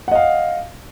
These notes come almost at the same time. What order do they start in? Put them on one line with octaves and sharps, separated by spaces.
F#5 D#5 F5